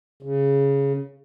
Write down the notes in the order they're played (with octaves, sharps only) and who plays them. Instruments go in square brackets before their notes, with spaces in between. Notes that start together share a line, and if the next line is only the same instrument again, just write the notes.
[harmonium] C#3